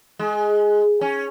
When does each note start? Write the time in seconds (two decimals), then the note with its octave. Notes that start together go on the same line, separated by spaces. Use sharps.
0.19 G#3
1.01 C#4